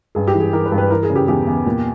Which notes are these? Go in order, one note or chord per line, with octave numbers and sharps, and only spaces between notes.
G2 G#4
G4
E3
G#4
E3 A#4
B4
G2
B4
E3 A#4
G#4
C#3
G4
E2 G4
E2
A#2